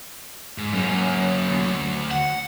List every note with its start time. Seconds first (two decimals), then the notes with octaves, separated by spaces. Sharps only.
0.58 G#2
0.73 F#2 A#3 C#4
1.50 D2
2.11 F#5